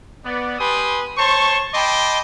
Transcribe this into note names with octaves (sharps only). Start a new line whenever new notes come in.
B3 D5
G4 B4 G#5 B5 C6 D#6
C5 C#5 A5 C6 C#6
D#5 G5 A5 B5 C6 D6